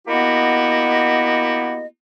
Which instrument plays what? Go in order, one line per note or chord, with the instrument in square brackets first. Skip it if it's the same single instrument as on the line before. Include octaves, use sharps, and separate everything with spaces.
[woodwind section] A#3 B3 E4 F#4 G4 D#5